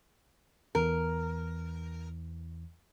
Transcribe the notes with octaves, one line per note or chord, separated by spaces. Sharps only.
E2 E3 A#4